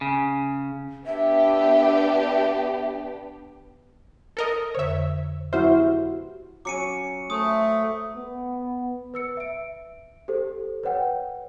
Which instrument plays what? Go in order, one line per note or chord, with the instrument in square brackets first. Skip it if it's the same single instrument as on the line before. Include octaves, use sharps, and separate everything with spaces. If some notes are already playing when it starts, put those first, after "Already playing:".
[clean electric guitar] C#3
[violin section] B3 D4 G4 [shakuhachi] E5
[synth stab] A4 A#4 D#5
[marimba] F2 D3 C5 [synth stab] C#5 E5
[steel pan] E4 F#4 E5 [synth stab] C5 [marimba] F6
[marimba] G4
[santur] F#3 C#4 [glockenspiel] D6 C#7 D#7
[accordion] A3 [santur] C5 C#5 [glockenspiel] D#6
[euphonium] B3
[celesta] B4 E6 C#7
E5 D7
G4 A4 C5
B4 C#5 F#5 G5